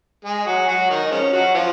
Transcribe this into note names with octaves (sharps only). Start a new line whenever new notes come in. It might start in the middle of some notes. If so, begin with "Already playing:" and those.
G#3 G#4
F#3 F#4
F#3 F#4
D#3 D#4
F3 G#3 C#4
F#3 F#4
F3 F4